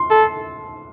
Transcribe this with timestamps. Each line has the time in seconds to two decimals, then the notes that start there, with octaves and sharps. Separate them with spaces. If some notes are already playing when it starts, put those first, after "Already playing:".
Already playing: C6
0.10 A4